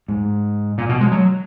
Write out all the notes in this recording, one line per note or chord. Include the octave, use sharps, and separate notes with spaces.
G#2
A#2
B2
G#3
F#3